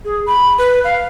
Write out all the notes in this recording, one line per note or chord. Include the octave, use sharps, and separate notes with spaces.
G#4
B5
B4
F5